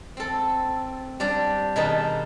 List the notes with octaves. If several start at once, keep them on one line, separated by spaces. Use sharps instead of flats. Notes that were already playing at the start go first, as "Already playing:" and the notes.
C4 A4
G3 D4 C5 D5
B2 D#3 D#4 G#4 B4 A5